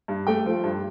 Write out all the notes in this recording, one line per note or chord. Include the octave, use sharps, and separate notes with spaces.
G2
A3 G5
F3
G2